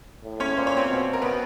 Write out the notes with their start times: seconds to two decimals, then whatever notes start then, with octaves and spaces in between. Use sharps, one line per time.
0.24 A2
0.40 C#4 C#5
0.57 A#2 C5
0.67 C#5
0.77 C4 C5
0.89 B2
1.13 A#4
1.22 B3 B4